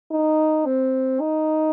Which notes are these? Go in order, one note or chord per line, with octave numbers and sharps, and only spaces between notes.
D#4
C4
D#4